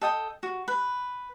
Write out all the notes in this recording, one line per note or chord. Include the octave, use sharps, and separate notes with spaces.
A4 D#5 G5 D#6
F#4
B4